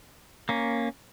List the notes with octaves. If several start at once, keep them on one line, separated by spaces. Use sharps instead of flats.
A#3 C#4